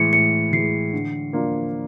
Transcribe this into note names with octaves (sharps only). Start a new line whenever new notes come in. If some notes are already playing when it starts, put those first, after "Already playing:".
Already playing: A2 E3 G#3 C#7
A2 C#7
E3 G#3 C7
D3
F3 A#3 D4 F4